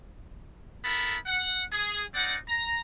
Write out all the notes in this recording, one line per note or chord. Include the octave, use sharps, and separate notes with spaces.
B3 E4 A4 A#4 B5
F#5
G#4
C4 D#4 D5 F#5
A#5